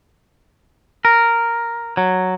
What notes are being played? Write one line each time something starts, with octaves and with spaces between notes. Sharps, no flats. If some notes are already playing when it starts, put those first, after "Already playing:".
A#4
F#3